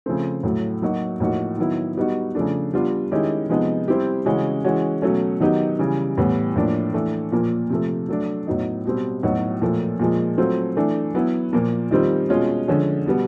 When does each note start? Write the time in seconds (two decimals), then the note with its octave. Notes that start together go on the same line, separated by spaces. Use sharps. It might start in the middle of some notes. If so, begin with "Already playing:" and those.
0.06 C#3 F3 A3 C4
0.43 A2 F#3 A3
0.82 F#3 A#3 D#4 F#4
1.20 A2 F3 A#3 D#4 F#4
1.58 D#3 F#3 B3 E4
1.97 G3 B3 D#4 F#4
2.35 C#3 F3 A3 D4
2.73 G3 B3 D4 F4
3.12 D#3 G#3 C#4 E4 G4
3.49 C3 F3 G#3 B3 D#4
3.88 G3 C4 E4 G4
4.25 C#3 E3 G#3 C#4 F#4
4.65 E3 G#3 C#4 F#4
5.02 B2 F#3 A3 C#4
5.40 D#3 F#3 B3 D#4 G4
5.79 C#3 E3 G3
6.18 A2 E3 G3 B3
6.56 A2 F3 A#3 D4
6.94 E3 A3 D4
7.32 A#2 F3 A#3
7.70 C3 F3 A3
8.09 F#3 A3 D4
8.47 A2 F#3 B3 D#4
8.86 B2 G3 C4
9.23 A2 F#3 B3 D#4 F#4
9.62 A#2 F3 A3
10.00 A#2 F3 G#3
10.38 F#3 A3 C4 F4
10.76 E3 A3 D4
11.14 F#3 B3 E4
11.53 A#2 F3 A#3
11.91 D#3 G3 C4 F4
12.29 B2 G#3 C#4 F4
12.68 D3 F3 G#3 C#4
13.06 B2 G3 B3